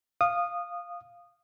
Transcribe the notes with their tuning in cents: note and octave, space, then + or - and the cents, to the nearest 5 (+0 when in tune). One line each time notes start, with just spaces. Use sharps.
F5 +0 D#6 -15